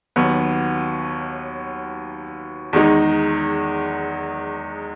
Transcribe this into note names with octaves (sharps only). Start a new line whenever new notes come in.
D#2 D#3 F#3 B3
E2 D#3 G#3 D#4